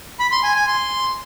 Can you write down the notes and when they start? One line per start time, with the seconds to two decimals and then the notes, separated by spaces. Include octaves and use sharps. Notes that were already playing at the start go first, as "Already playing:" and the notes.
0.20 B5
0.31 C6
0.43 G#5
0.55 G#5
0.67 C6